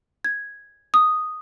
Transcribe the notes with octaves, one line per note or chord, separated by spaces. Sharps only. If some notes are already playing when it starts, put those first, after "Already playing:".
G#6
D#6